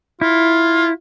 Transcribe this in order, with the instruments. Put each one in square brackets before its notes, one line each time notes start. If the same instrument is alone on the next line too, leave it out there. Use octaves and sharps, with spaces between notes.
[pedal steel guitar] E4 [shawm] F4